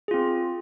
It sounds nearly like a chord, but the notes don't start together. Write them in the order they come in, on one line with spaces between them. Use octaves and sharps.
G#4 F4 C4